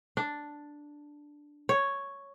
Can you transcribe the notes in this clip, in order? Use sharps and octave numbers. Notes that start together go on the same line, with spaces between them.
D4
C#5